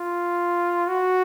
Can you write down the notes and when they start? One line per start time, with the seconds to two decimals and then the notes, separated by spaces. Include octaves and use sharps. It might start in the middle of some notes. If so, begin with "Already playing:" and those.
Already playing: F4
0.88 F#4